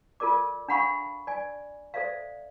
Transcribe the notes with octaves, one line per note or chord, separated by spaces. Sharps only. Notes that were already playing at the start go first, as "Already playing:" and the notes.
F4 A4 A#4 D5 D6
D4 F5 F#5 B5 C#6 D#6
D5 G#5
A4 C5 D5 E5 F5